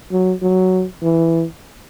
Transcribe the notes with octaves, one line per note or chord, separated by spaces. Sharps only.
F#3
F#3
E3